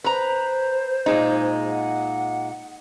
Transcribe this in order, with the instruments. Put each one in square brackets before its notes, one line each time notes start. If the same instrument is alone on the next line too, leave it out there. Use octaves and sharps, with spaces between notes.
[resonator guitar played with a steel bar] B4 A#5 [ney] C5
[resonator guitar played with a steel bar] A#2 G#3 D#4
[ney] F#5